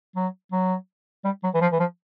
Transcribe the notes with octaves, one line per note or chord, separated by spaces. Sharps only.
F#3
F#3
G3
F#3
E3
F3
E3
F3